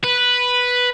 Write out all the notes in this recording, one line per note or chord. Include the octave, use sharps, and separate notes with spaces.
B4